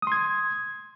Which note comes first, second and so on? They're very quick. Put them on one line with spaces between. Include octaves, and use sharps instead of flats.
D#6 C6 G#6